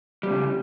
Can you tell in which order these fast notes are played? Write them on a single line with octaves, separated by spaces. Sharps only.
G3 A#2 C#3